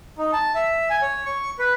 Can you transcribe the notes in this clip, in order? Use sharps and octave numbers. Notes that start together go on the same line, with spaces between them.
D#4
A5
E5
G#5
C#5
C#6
B4